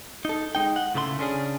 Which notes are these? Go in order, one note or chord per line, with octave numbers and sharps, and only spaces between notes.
D#4 A4
G#3 D#4 G5
F#5
A2 C#3 A3 D5 C6
C#3 C#4 D4 G#4